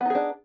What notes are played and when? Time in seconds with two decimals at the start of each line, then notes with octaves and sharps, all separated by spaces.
0.01 B3
0.05 D#4
0.10 G#4
0.15 D4